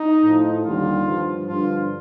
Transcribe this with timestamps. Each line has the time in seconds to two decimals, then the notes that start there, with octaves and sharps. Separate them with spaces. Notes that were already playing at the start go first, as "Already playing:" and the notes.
Already playing: D#4
0.21 A2 F3
0.62 D#2 D3 G3 F4
1.04 G2 F3
1.45 G2 D3 F3 F4